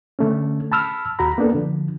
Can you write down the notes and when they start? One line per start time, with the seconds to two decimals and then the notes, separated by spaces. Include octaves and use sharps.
0.19 D3 A3 C#4
0.72 A5 B5 E6 F6
1.19 D#2 F#4 A#5 B5
1.38 A#3 B3 D4 A4
1.54 D3 F3